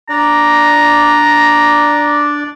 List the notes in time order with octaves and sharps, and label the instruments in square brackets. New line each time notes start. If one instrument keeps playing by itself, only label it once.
[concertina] D4 D5 [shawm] A#5